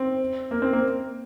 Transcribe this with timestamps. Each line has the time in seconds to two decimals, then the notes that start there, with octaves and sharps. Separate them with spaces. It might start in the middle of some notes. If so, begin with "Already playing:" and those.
Already playing: C4
0.51 A#3
0.62 C4
0.73 A#3